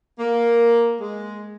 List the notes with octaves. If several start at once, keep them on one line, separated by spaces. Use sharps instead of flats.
A#3
G#3